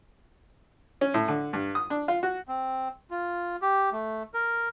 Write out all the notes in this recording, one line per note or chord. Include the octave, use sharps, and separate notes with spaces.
C#4
A2
D3
G2
D#6
D4
F4
F#4
C4
F4
G4
A3
A#4